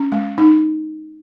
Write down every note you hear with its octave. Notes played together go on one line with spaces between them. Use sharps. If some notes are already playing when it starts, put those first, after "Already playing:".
Already playing: C#4
G#3
D#4